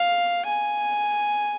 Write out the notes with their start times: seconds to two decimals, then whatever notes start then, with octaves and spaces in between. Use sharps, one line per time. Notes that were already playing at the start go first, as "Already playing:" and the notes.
Already playing: F5
0.46 G#5